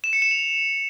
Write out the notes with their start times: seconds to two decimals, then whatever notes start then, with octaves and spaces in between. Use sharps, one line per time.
0.04 E7
0.13 C#7
0.22 E7
0.31 F7